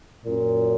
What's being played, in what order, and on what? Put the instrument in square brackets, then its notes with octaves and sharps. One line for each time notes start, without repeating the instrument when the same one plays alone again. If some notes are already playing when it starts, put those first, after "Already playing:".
[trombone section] F#2 A#2